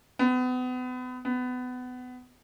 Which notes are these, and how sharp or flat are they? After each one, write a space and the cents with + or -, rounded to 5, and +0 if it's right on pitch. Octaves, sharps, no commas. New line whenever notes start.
B3 +35
B3 +25